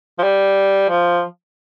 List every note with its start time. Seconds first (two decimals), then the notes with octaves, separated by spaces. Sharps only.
0.18 F3
0.23 G3
0.89 F3